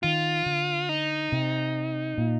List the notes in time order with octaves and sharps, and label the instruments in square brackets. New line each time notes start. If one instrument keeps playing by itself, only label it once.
[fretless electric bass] D#3 [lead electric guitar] F4
[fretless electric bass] D3
[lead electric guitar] D#4
[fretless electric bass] C3
A#2